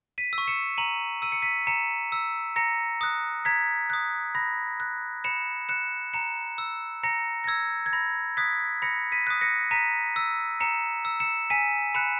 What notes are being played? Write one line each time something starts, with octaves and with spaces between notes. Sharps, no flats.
B6 D#7
E6
C#6
C#7 E7
A#5 D#7 F#7
E6 D#7
C#7
B6 D#7
A#5 C#7 E7
E6
A#5 A#6 C#7
D#6 F#6
A#5 G#6 B6
D#6 F#6
B5 A#6
F#6
B5 C#7 E7
F#6 C#7 E7
A#5 C#7 E7
E6
A#5 A#6 C#7
A#6
E6 G#6
G#6
B5 A#6
D#6 F#6 G#6 B6
B5 A#6 C#7
B6 D#7
D#6 F#6
A#6 C#7
A#5 B6 D#7
E6
A#5 C#7 E7
E6
C#7 E7
G#5 B6 D#7
B5 F#6 C#7 E7